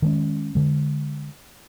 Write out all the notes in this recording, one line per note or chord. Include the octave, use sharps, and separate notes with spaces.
D#3 G#3 C#4
D3 G#3